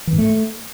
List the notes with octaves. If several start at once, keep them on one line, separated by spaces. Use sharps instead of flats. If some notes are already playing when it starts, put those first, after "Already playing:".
E3
G#2
A3